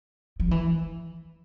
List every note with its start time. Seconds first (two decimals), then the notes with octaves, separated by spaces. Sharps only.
0.40 F3
0.51 E3